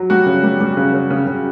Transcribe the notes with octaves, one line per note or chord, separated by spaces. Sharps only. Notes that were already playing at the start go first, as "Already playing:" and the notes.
Already playing: F#3
G3 F#4
C#3
G3
G3
C#3
C#3
C#3
C#3